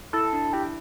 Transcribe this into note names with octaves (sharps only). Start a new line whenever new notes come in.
E4 A4
D4
E4 G4